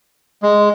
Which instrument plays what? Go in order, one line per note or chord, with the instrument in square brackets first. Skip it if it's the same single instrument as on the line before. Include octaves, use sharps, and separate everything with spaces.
[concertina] G#3